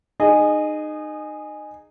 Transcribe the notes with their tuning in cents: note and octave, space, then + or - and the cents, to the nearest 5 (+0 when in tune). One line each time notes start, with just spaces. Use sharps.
D#4 -25 G#4 +0 D#5 -20